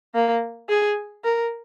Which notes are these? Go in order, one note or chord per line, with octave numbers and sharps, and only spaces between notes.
A#3
G#4
A#4